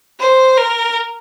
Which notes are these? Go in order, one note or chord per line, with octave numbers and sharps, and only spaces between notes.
C5
A#4